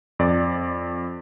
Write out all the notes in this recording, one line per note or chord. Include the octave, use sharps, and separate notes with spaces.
F2 D5